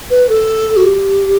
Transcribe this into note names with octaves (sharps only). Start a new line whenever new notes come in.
B4
A4
F#4
G4